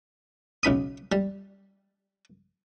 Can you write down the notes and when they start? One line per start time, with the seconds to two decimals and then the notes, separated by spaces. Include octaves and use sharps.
0.63 B1 C#3 B5 D#6
1.12 G3